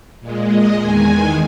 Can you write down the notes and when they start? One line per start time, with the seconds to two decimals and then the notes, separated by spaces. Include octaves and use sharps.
0.21 A#2 G#3
0.49 D#5
0.78 E2 D#3 G#3 G#5